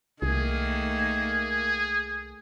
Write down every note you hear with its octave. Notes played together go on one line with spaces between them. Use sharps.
C2 D#3 A3 A#3 G#4